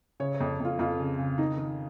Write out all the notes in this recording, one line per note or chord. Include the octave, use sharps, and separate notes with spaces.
C#3 C#5
C#5
F2
F2 F4
F2 F4
C#3
C#3
D#3 D#4
D#3